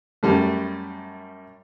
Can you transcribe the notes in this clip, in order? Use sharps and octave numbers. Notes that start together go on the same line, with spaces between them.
F#2 G3 A3